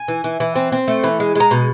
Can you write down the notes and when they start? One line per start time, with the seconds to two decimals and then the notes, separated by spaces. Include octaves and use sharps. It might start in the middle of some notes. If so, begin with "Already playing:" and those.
Already playing: G#5
0.08 E3
0.24 E3
0.40 E3
0.55 C4
0.72 C4
0.88 A3
1.04 E3
1.20 G#3
1.35 G#3 A#5
1.51 B2